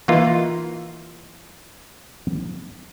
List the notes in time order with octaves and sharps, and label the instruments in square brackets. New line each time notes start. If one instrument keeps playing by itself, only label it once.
[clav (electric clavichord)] E3 A#3 D#4 F4